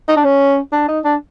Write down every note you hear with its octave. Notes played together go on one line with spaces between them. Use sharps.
D#4
D4
C#4
D4
D#4
D4